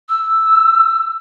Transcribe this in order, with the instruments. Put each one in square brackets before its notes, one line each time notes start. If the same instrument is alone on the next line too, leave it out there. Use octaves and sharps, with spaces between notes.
[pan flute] E6